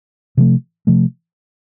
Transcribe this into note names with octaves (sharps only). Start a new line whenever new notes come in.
C3 F3 A3
C3 F3 A3